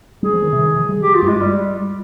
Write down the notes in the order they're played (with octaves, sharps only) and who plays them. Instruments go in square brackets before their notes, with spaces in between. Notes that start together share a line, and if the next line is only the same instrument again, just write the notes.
[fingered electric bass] G3 [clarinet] G#4
[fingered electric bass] F3
D#3
C3
D#3
F3
G3
[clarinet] G4
F4
[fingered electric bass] G2
[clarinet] G#3
G3